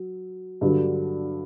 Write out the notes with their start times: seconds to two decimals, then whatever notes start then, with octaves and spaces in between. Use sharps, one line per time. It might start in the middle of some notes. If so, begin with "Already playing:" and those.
Already playing: F#3
0.61 G2 D3 F#3